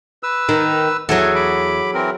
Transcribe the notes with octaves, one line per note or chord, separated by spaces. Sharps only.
B4 E6
D#3
E2 F#3 G#4 A4
B5 D6
E3 C4 A#4